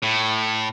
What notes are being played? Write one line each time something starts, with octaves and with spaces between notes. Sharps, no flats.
A2